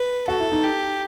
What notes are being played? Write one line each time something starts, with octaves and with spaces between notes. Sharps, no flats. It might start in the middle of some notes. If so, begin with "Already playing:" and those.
Already playing: B4
F#4 A4
E4
D#4
G4